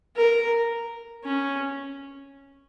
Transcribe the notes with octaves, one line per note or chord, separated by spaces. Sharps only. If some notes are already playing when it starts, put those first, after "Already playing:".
A#4
C#4